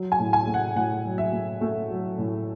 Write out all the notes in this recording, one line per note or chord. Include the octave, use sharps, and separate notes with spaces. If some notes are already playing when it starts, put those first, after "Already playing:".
Already playing: F#3
G#5
A2
G#5
A3
F#5
A2 F#5
F#3
E5
A3
A3
F#3
A2